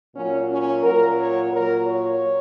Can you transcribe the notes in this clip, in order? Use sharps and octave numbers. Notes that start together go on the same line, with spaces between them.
A#2 F#3 C#4
C#4
A#2 F#3 A#4
C#5
A#2 F#3 A#4
C#5